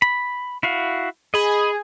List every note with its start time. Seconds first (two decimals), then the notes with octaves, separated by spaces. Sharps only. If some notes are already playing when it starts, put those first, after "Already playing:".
0.02 B5
0.63 E4 F#4 F5
1.34 G#4 D#5 B5